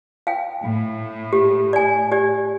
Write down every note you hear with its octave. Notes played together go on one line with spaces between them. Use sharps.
F5 G5
A2
G4
D5 G#5
G4 D5